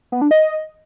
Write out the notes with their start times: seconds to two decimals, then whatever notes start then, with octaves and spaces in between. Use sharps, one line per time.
0.12 B3
0.22 D4
0.31 D#5